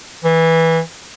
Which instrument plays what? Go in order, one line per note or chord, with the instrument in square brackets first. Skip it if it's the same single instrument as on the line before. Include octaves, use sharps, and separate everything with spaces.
[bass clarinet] E3